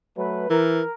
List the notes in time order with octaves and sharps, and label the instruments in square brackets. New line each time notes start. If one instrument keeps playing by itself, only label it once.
[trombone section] F#3 A3 B4
[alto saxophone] E3 [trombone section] A#4